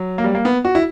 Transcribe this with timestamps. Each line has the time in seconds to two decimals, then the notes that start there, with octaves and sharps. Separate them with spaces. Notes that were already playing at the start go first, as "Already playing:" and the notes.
Already playing: F#3
0.18 A#3
0.24 G3
0.35 A#3
0.45 B3
0.65 F#4
0.75 E4